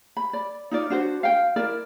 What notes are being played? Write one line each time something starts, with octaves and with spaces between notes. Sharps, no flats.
B5
D5
D#4 F4 D5
D4 F#4 C5
F5 G5
E4 A#4 D5